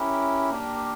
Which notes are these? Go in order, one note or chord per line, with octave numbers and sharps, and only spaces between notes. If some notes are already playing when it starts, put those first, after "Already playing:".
Already playing: C#4 E4 G4 A#4
A#3 D4 G4